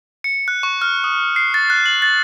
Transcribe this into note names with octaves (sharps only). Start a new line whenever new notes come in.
C#7
F#6
C#6
F6
D#6
C7
A6
F#6
F#7
A6